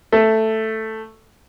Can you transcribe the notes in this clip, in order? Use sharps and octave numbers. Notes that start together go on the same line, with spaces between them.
A3